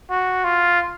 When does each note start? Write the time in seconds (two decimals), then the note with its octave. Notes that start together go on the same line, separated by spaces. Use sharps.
0.10 F#4
0.45 F4